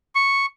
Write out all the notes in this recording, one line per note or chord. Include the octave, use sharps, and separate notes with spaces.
C#6